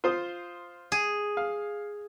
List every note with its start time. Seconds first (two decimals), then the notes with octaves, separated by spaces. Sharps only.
0.04 F4 C5 D#6
0.92 G#4
1.37 F5